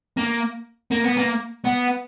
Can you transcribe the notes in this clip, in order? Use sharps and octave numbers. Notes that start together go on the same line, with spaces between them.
A#3
A#3
B3
A#3
B3